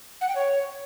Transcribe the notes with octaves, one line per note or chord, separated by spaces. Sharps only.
F#5
G5
C#5